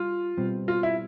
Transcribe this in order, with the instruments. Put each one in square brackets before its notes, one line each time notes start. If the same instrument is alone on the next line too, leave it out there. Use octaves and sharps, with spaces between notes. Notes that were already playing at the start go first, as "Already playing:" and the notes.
Already playing: [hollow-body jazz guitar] G3 [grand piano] F4
[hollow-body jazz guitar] B2 G3 C4
[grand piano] F4
E4